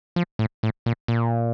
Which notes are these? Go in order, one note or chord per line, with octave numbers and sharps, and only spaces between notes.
F3
A2
A2
A#2
A#2